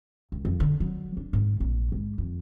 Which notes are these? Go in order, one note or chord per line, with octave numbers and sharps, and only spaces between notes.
C#2
F2
D3
F#3
D4
G#2
A#1
G#2
F2